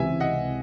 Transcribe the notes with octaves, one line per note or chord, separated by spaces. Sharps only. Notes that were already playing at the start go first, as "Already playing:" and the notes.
Already playing: C#2 C3 E3 E5 G#5
D#5 F#5